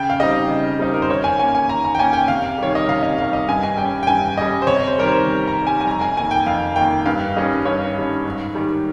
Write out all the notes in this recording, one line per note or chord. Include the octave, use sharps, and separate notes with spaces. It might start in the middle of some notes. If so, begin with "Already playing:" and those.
Already playing: C#3 G5
F5
G3 C4 D#4 D#5
C#3
G3 C4 D#4
A#4
C5
D#3 C#5
G#5
A#3 C#4 G#5
G#5
D#3 A#5
A#5
G5
A#3 C#4 G#5
G5
C3 F5
D#3 G3 C#5
D#5
C3 F5
D#5
D#3 G3 F5
D#5
G2 G#5
G#5
G3 C#4 G5
G5
G2 G#5
G3 C#4 D#5
C5
C3 C#5
C5
D#3 G3 A#4
C5
C3
A#5
D#3 G3
G#5
G#5
F2 A#5
G#5
D#3 A#3 G#5
G5
F2 F5
D#3 A#3 G5
G2 F5
D#3 G3 C#4 D#5
G2 C#5
D#3 G3 C#4
G#2
D#3 G3